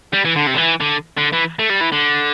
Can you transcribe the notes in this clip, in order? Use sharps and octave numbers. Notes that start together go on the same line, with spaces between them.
G3
E3
D3
C3
D3
E3
D3
D3
E3
A3
G3
E3
D3